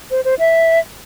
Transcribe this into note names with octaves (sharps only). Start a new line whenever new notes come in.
C5
C5
E5